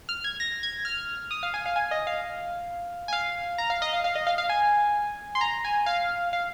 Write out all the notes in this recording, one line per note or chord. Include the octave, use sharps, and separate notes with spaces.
F6
G#6
A#6
G#6
F6
D#6
F5
G#5
F5
G#5
D#5
F5
G#5
F5
A#5
F5
D#5
F5
F5
D#5
F5
F5
G#5
C6
A#5
G#5
F5
F5